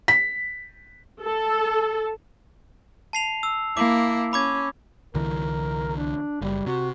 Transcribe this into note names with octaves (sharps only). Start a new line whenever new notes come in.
B6
A4
A5 C7 F7
E6
A#3 E4 D6
C#4 B5 D6 G#6
C2 D3 E3 A#4
D4
F#1 G3
C3 F#4